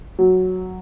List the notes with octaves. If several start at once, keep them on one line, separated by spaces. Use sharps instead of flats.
F#3